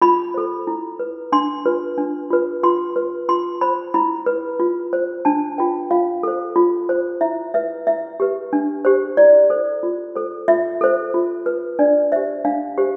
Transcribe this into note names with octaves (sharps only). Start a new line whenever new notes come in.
F4 B5
A4 C5
E4
B4
D4 C6
F4 B4
D4
F4 B4
F4 C6
B4
F4 C6
C5 B5
E4 B5
B4
F4
C5
D4 A5
F4 B4 G5
F4 F5
A4 C5
F4
C5
E4 E5
B4 E5
E4 E5
G4 B4
D4
G4 C5
E4 D5
A4 C5
F4
A4 C5
F4 E5
A4 C5
F4
B4
D4 D5
G4 C5 E5
D4 F5
G4 C5